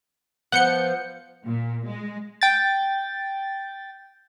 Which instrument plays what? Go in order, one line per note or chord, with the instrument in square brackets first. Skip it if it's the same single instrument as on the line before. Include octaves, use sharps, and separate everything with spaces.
[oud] F3 B3 [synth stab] F#5 G6 C#7
[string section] A#2
G#3
[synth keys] G5 A6